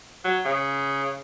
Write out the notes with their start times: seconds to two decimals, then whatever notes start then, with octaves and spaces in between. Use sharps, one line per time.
0.24 F#3
0.45 C#3